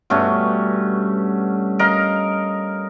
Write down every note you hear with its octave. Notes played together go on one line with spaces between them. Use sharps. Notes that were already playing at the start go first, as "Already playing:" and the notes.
G2 B2 A3 C#4
A#4 D#5 F5